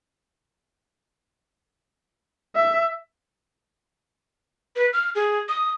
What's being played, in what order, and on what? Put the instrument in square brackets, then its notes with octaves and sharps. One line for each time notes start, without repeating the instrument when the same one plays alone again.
[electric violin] E5
[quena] B4
F6
G#4
D#6